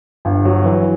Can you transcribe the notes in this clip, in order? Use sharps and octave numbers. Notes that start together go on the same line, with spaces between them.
G1
F#3
E3